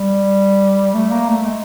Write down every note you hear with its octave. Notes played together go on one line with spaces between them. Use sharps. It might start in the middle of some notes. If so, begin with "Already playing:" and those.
Already playing: G3
A3
A#3
A3
G#3